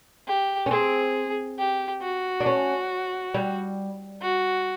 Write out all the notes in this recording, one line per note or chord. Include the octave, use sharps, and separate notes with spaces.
G4
C#4
C4 G#4
G4
F#4
D4
C#4
G3
F#4